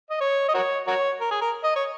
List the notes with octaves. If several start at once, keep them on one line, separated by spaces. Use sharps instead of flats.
D#5
C#5
D#5
F#4 A#4 C#5
F#4 A#4 C#5
A#4
G#4
A#4
D#5
C#5